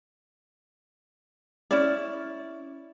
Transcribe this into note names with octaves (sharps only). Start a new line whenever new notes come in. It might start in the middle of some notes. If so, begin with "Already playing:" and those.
C#4 E4 D5